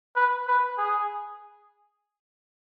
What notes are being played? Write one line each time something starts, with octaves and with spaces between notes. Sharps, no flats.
B4
B4
G#4